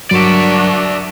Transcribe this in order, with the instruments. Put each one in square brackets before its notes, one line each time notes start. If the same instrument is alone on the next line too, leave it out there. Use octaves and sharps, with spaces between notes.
[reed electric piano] G2 F#3 [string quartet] D4 F#4 A#4 [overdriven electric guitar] D5 E5